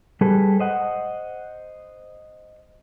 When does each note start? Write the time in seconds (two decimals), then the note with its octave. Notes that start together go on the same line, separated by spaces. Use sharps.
0.21 G3 G#4 A4 B4
0.60 C5 D#5 F#5